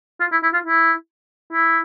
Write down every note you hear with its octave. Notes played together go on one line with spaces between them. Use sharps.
F4
E4
E4
F4
E4
E4